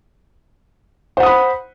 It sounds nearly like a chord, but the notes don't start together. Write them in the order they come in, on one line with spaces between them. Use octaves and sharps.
C5 F#5 D#6 B5